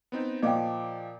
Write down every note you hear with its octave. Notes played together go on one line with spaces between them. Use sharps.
B3 C4 D#4
A#2 F3 D#5 F5 G5 D6